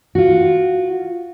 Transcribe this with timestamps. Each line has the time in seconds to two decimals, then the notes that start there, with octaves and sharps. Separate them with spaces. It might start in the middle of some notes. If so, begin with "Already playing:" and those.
0.15 F4 F#4